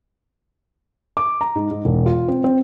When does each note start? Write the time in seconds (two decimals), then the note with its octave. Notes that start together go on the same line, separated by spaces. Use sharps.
1.17 D6
1.41 A#5
1.55 G#2
1.71 G#2
1.85 E1
2.06 F4
2.28 C4
2.44 C4